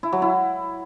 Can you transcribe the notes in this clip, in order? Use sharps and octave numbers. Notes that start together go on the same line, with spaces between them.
E4
F#3
E4